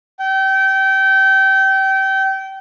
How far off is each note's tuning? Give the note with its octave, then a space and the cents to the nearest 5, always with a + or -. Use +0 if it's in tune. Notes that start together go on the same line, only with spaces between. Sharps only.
G5 -25